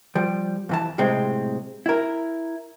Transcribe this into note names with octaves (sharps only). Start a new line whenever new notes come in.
F3 G3
F2 E3 A5
B1 A2 C3 G#3 C4
E4 A#4